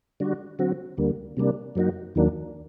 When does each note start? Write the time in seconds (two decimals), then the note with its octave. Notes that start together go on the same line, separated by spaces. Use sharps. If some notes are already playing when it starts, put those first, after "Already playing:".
0.20 D3 G3 D4 F#4
0.59 D3 F#3 C4 F#4
0.97 D2 D3 G3 A#3
1.37 C3 G3 A#3 D4
1.75 F#2 F#3 A#3 D#4 F#4
2.15 D#2 D#3 F#3 A#3 D4